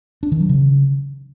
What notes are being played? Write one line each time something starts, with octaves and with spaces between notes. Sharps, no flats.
D4
D#3
F#3
C#3